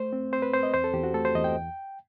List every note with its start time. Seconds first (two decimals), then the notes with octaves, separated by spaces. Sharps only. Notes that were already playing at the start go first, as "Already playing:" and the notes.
Already playing: A3 C5
0.13 C4
0.32 C4 C5
0.42 B4
0.53 C4 C5
0.63 D#5
0.74 E2 C5
0.84 A4
0.93 E2 G4
1.04 F#4
1.14 A3 A4
1.25 C5
1.35 E2 D#5
1.44 G5